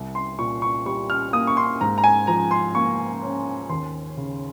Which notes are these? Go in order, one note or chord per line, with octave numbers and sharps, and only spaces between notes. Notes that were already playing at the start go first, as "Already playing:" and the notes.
Already playing: C2
C6
A#2 C#6
C#6
G3 C#6
F6
A#3 D#6
C#6
C6
G#2 A#5
A#5
G#5
F3 A#5
C6
A#3 C#6
C#4
D#2 C6
C#3